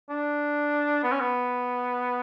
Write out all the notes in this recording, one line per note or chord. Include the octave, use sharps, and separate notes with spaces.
D4
B3
C#4
B3